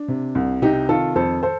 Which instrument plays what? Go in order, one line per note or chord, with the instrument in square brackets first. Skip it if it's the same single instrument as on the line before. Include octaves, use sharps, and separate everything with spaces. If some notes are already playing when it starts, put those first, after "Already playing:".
Already playing: [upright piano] D4
C3
C2
C3 D#4 G4
D#3 F4 A4
F2 A4 C5
A4 C5